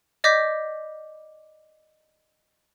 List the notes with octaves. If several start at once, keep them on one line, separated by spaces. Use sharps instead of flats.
D5 D#5 D6 G6 B6